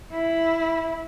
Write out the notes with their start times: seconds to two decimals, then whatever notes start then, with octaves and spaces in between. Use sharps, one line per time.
0.12 E4